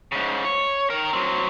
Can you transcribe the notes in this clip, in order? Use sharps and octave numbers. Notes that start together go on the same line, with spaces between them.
G#2 C#3
C#5
D#3 A#4
F#3 C4